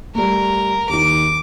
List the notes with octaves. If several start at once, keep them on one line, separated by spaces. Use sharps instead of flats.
G3 A3 A#4
D#2 D#3 D6